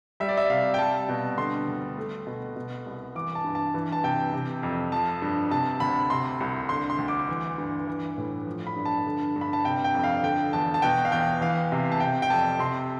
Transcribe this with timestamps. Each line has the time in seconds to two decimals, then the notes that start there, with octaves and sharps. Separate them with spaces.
0.20 G3 E5
0.29 D5
0.37 E5
0.50 C3 F5
0.74 G5
0.78 G3 A5
1.09 B2
1.37 D3 C6
1.68 D2
1.98 A3
2.27 B2
2.56 B2
2.86 C2
3.15 E3 D6
3.35 A5
3.44 G2
3.55 A5
3.74 E3
3.92 A5
4.03 C3 G5
4.33 C3
4.63 F2
4.92 F3 A5
5.22 G2
5.51 C3 A5
5.80 D2 B5
6.10 C3 C6
6.41 C2
6.69 D3 C6
6.90 C6
6.98 D2
7.08 D6
7.29 E3
7.58 G2
7.87 E3
8.18 A2
8.47 F3
8.67 B5
8.76 G2
8.85 A5
9.06 D3
9.36 G2
9.41 B5
9.53 A5
9.65 C3 G5
9.84 G5
9.95 F2
10.04 F5
10.23 D3 G5
10.53 E2 A5
10.74 A5
10.82 B2 G5
11.05 F5
11.12 E2 G5
11.41 E3 F5
11.72 C3
11.92 A5
12.00 C3 G5
12.22 G5
12.30 F2 A5
12.59 C3 C6